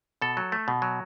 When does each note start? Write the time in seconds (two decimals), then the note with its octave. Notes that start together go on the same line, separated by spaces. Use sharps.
0.22 B2 A4
0.37 F#3
0.52 A3
0.68 B2
0.82 F#3